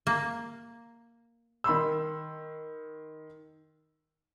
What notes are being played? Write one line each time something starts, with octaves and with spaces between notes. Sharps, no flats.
A#3
D#3 B5 C6 E6